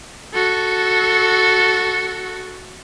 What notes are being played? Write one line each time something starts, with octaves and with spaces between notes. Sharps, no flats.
F#4 A4